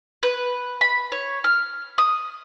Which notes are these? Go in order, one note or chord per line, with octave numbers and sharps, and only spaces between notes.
B4
B5
C#5
F6
D#6